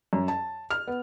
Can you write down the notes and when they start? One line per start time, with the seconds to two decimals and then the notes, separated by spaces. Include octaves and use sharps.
0.13 F#2
0.28 A5
0.70 F6
0.87 B3